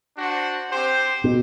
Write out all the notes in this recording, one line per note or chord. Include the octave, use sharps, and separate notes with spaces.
D4 F#4 C5 F#5
C4 G4 C5
B2